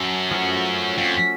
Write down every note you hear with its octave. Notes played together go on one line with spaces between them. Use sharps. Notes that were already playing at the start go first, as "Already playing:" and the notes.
Already playing: F#2 C#4 A4
F3 A3 C#4 F#4
F2